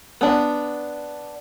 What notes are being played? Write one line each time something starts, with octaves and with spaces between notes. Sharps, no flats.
B3 D4